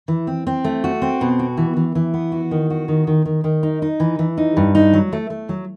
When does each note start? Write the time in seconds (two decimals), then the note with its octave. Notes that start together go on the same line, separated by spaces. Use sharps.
0.08 E3
0.27 C4
0.47 C4
0.64 A3
0.84 F#4
1.02 C4
1.21 B2
1.39 F#4
1.57 E3
1.77 E3
1.95 E3
2.14 B3
2.32 F#4
2.51 D#3
2.70 F#4
2.88 D#3
3.07 D#3
3.25 D#3
3.44 D#3
3.63 D#4
3.82 D#4
4.00 E3
4.19 E3
4.38 D#4
4.57 G2
4.75 D#4
4.93 F#3
5.13 A3
5.30 A3
5.49 F#3